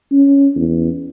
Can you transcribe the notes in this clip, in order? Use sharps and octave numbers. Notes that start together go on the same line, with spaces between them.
C#4
E2